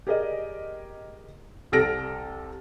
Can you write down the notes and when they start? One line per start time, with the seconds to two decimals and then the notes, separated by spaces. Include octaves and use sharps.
0.07 G4 G#4 A#4 D5 D#5
1.72 C2 C3 A4 F6 A#6 D7